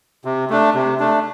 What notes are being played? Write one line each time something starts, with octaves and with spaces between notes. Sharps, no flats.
C3
A3 D4
C3
A3 D4